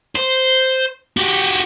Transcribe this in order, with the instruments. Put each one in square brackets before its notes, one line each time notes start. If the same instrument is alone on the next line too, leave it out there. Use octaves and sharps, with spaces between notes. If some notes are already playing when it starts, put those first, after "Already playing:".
[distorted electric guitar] C5
F#4 G4